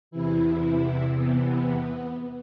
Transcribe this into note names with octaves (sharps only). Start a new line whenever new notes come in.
E2 C3 E3 E4
B3